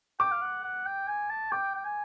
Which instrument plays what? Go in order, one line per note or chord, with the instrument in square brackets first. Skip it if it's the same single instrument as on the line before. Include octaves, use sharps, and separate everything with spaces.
[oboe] G5 [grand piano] D6
[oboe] F5
F#5
F#5
G5
G#5
A5
[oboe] G5 [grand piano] D6
[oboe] G5
G#5